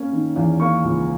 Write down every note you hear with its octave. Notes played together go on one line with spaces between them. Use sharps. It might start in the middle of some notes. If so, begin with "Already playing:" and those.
Already playing: A#3 C#4
D#3
E2
A#3 C#6
C#2